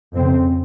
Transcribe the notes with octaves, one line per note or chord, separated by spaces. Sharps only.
F2 C#3 C4